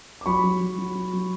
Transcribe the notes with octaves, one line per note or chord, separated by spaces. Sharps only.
D6
F#3 B5 C#6
F#3
F#3
F#3
F#3
F#3